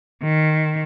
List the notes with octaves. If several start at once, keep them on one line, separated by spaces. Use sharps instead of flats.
D#3